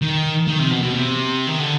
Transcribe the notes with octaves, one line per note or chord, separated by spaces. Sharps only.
D#3
D#3
C3
B2
B2
C3
D#3
D3